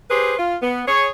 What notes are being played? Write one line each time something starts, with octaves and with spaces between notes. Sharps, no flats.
G4 G#4 B4 C5
F4
B3
G#4 C#5